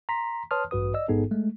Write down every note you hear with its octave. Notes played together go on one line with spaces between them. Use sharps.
A#5 C6 B6
B4 C#5 A5 C6 D#6 F6
A1 G2 F#4 B4 D#6
D5 D#5 E6
A1 G#2 B3 D#4 G#4 A4
G#3 A3